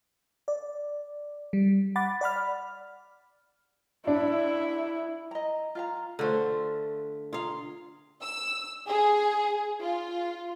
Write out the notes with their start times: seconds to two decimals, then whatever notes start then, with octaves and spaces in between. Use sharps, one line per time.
0.48 D5
1.53 G3
1.96 F#5 B5 D6 A6
2.21 D5 F#5 B5 F6
4.07 D4 E4
5.31 D#5 A#5
5.75 F4 F5 A#5
6.19 D3 A3 F4 C5
7.33 F4 G#4 F5 A#5
8.21 E6
8.88 G#4
9.80 F4